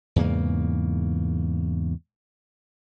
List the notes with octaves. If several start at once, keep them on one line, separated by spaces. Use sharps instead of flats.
E2 G#2 C#3 A#3